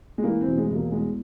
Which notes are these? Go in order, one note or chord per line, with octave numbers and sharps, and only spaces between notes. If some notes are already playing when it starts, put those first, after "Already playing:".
G#3
E3 A#3
C4
E1
G#3
E1
A#3
E2 G#3